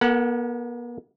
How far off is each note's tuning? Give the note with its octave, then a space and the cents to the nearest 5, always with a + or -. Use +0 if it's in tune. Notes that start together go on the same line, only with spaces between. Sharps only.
B3 -45 A4 +45 F#5 +0